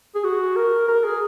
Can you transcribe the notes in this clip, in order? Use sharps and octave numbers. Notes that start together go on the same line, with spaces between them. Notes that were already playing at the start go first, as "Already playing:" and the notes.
G#4
F#4
A#4
A#4
G#4